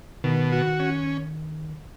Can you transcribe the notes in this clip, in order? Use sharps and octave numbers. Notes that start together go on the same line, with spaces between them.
B2 D#3
F#4
C#4